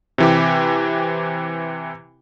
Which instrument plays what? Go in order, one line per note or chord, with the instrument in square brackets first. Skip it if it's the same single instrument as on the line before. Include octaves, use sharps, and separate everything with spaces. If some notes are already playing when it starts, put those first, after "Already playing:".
[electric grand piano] C3 E3 G4